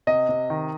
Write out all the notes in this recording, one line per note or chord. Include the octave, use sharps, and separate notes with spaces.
C3 D#5
C3
D#3